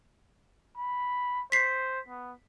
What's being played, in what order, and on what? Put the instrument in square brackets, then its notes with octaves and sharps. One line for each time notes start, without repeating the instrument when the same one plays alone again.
[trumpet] B5
[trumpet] C5 [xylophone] B6 C7
[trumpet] B3